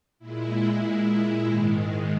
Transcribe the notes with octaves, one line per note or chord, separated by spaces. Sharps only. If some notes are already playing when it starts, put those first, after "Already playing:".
A#2 G#3 E4
G#2 D#3 G#3